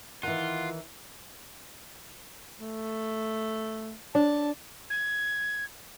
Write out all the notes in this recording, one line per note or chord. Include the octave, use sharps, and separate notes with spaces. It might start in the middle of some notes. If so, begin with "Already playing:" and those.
D#3 E3 F4 F#5
A3
D4 A5
G#6